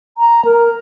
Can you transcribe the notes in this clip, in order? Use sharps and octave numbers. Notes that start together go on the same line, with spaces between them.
A#5
A#4